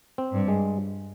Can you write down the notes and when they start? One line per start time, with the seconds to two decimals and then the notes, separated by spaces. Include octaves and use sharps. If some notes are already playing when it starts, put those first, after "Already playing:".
0.18 C4
0.34 G2
0.48 G#3